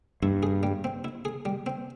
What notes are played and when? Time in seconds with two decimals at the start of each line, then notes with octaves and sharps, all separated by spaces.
0.23 G2 E4
0.43 G#4
0.63 G3
0.84 C4
1.04 E4
1.25 G#4
1.45 G3
1.66 C4